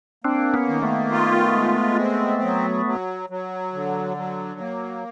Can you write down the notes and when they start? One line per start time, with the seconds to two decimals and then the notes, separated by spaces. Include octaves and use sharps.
0.24 A#3 C4 D4
0.54 B3 C#4
0.68 D#3
0.82 A3 B3
1.12 F4
1.55 G#3
1.99 C4
2.42 F#3
2.86 F#3
3.30 F#3
3.73 D3
4.17 F#3
4.60 A#3